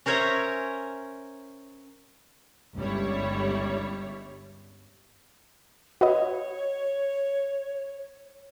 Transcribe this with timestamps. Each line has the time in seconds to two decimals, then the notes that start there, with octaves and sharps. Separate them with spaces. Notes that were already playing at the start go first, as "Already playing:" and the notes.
0.06 C#4 A#4 C5 C#5 E5 A#5
2.75 G1 C#2 G3 E4 C#5
6.01 F#4 B4 C#5 D#5